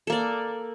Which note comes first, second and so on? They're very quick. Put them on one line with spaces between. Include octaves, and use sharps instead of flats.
A4 A#3 D5